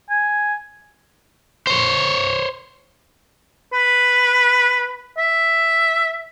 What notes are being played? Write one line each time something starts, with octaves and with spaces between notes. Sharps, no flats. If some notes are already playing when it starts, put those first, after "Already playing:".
G#5
C5 C#5
B4
E5